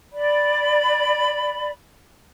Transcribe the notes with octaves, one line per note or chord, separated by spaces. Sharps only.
D5 B5